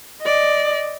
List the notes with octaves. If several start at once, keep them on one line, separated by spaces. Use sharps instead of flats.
D5 D#5